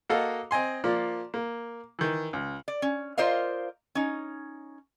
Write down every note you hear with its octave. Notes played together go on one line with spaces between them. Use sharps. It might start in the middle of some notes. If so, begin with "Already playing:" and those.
A#3 F#4 A4 D#5 F5
C4 D#5 G#5 C6
F3 A#3 D5
A#3
D#3 E3
C#2
D5
C#4
F4 A#4 C5 D5 D#5 F5
C#4 D#4